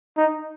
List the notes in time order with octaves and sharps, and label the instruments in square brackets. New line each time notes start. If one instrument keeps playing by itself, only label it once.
[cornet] D#4